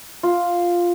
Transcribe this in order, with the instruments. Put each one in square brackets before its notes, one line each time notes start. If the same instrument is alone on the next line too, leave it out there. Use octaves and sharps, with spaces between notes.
[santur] F4